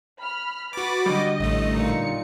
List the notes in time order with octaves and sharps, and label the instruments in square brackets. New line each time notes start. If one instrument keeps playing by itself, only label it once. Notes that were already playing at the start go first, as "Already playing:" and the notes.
[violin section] B5 F6
[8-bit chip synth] F#4 D6 [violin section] B4 B5 A6
[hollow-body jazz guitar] D3 G3 [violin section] D#5
[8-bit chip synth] A1 A3
[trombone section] A#2 [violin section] D#4 C#7